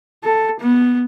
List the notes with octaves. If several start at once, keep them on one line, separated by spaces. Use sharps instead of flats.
A4
B3